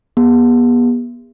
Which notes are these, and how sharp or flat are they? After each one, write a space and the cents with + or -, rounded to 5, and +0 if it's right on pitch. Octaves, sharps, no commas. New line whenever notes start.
B3 -35 G#4 -45